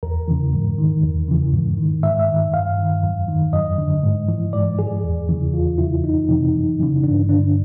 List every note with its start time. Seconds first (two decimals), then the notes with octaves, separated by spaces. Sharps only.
0.03 E2 A#4
0.28 C#3 E3
0.53 G#2
0.78 D#3
1.04 E2
1.28 C#3 E3
1.53 G#2
1.78 D#3
2.03 G#2 E5
2.19 E5
2.29 D#3
2.54 G2 F5
2.79 D#3
3.03 F#2
3.28 D#3
3.53 F#2 D#5
3.78 D3
4.03 G#2
4.28 E3
4.53 G#2 D5
4.78 E3 G#4
5.04 E2
5.29 C#3 E3
5.54 E2 F4
5.78 C#3 E3 E4
6.04 F2 D#4
6.29 C3 E3
6.54 F#2
6.79 C#3 E3
7.04 G2 D4
7.29 D3 D4